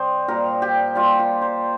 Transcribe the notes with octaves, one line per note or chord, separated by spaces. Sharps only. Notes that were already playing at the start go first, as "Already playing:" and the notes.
Already playing: C3 G3 C5 D#5
A#2 G3 A#4
G4
A#2 G3 F4
F4
C5